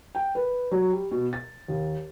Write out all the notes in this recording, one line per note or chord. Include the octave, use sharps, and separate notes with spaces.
G5
B4
F#3
G3
B2
A6
D#2